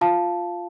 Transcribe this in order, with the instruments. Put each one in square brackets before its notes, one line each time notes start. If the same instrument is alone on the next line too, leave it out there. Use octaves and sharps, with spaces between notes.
[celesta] F4 F5 A5